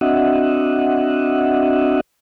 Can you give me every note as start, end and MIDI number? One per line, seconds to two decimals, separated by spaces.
0.01 2.00 60
0.01 2.00 62
0.01 2.00 66
0.01 2.00 75
0.01 2.00 76
0.01 2.00 78